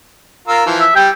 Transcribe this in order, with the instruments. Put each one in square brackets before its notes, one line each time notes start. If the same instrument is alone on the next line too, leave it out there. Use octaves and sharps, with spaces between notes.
[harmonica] F4 A#4 E6
E3 F3
[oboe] E5
[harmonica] G3 [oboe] G5